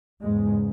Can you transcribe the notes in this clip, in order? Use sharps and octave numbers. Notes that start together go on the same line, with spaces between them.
E2 G#2 C#3 G#3